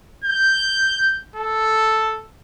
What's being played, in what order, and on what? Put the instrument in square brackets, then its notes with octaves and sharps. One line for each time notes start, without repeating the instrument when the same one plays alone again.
[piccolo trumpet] G6
A4